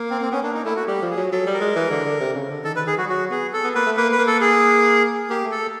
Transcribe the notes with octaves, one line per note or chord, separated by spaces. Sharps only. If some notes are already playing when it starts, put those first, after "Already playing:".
Already playing: A#3
C4
C4
B3 C#4
A#3 D4
D#4
A3 E4
F#4
G3 G4
F3
G#4
F#3
F#3 A4
G3
A#4
G#3
E3
D3
D3
C3
C#3
D3
D#3 A4
D#3 B4
D#3 G#4
F#3 F#4
G3
F#3 F#4
B3 G#4
A4
B3
A#3 B4
A3
A#3 B4
B4
A#3
A4
G#4
A#3 G4
A3
A4